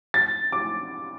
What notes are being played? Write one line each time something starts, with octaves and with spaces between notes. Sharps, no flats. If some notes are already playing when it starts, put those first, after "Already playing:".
A6
D6